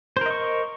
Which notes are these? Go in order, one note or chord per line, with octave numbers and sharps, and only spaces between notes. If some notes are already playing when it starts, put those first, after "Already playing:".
A#4 C5 D#5 C#6